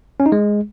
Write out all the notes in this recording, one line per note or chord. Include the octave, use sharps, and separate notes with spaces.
C#4
D#4
G#3